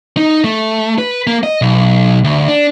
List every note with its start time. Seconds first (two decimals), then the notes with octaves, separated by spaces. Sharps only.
0.17 D#4
0.44 A3
0.98 B4
1.27 A#3
1.43 D#5
1.62 B1
2.24 D2
2.48 D4